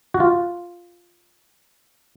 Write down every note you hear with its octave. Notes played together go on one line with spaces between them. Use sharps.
F#4
F4